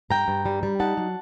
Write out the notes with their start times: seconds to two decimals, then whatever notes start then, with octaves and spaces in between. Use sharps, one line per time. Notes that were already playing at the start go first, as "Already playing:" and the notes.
0.10 G2 G5 A#5
0.28 G2
0.46 G3
0.63 G3
0.80 D#4 F#5 A5
0.97 F#3